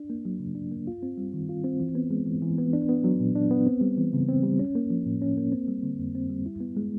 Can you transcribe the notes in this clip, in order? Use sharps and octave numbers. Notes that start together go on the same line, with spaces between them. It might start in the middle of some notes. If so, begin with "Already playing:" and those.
Already playing: D4
A#3
F#3
C#3
D4
A#3
F4
C4
G3
D#3
F4
C4
E3
B3
G#3
E3
E3
B3
D4
B3
F#3
A#2
D4
B3
C4
G3
E3
C#3
C4
G3
C#4
A#3
F3
A2
C#4
A#3
C4
G3
D3
F2
C4
G3
E4
B3
G#3